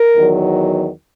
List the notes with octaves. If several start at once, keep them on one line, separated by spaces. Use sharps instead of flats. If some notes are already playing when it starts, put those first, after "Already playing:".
Already playing: A#4
E2 D#3 F#3